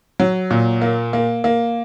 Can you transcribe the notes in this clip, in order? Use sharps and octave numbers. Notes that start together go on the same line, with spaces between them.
F#3
A#2
A#3
A#3
A#3